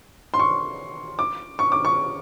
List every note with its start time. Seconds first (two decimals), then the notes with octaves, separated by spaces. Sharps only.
0.34 C6
0.39 C#6
1.19 D6
1.59 C#6
1.72 D6
1.85 C#6